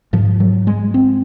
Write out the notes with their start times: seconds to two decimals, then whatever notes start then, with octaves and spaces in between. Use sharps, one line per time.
0.13 G#2 F3
0.40 F#3
0.67 G#3
0.94 C4